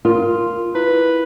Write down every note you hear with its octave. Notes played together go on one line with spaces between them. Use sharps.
F4 A#4
E4 B4